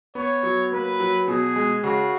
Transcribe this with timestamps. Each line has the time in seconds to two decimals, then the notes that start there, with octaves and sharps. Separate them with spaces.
0.15 B3 C#5
0.43 F#3
0.72 A#3 B4
1.00 F#3
1.28 B2 G#4
1.56 G#3
1.83 C#3 F#4